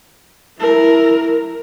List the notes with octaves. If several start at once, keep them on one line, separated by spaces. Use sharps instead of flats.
E4 A#4